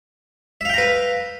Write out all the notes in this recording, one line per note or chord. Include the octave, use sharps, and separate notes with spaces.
B4 E5 F5 G5 A#5